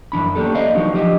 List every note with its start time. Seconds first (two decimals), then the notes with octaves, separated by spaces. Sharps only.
0.12 F#2 E3 D4 B5
0.35 A#3 C#4 D4 G4 A4
0.55 C5 D5 D#5 F5
0.75 E3 F#3 D4 D#4 F#4 G4
0.94 F3 D4 G4 D#5